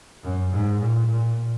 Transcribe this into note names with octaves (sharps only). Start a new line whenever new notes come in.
F#2
G#2
A#2
A#2